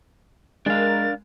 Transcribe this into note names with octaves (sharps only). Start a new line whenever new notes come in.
G#3 D4 A#4 F5 A6